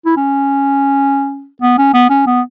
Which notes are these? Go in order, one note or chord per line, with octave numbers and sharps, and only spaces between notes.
E4
C#4
B3
C#4
B3
C#4
B3